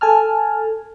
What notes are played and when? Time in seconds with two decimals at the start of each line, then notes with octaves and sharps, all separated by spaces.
0.01 A4 G#5 A5 F6